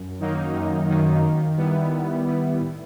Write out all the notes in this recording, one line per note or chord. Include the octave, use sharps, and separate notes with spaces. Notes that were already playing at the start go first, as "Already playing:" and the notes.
Already playing: F#2
D#3 F#3 A#3 D#4
F#2
D#3 F#3 A#3 D#4
D#3
G3 B3 E4
D#3
G3 B3 E4
A2